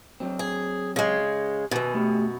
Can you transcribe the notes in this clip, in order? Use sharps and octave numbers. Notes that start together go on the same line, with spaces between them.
F#3 C4
G#4
C#3 G#3
F#2 B2 B4 G#5
A3 G4